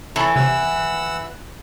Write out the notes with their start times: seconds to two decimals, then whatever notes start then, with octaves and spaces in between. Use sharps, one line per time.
0.16 E3 E4 A4 C#5 A5 B5
0.36 C3 F#5 E6